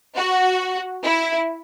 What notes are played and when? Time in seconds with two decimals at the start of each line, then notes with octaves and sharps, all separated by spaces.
0.16 F#4
1.04 E4